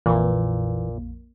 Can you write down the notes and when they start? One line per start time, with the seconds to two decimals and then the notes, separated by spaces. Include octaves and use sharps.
0.06 A#1 F2 A#2 E3 A#3